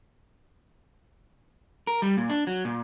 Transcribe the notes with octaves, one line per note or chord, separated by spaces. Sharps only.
A#4
G3
A#2
D4
F#3
A#2